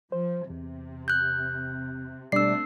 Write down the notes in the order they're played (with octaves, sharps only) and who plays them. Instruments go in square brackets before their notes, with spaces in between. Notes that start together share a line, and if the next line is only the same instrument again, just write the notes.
[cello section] F3 [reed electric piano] C5
[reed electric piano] E2 [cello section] C3
[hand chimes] F#6 G6
[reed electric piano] B2 G3 D5 [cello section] A3 C4 D4 [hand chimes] E6 C7